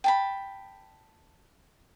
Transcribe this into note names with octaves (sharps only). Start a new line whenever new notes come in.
G5 A5 B5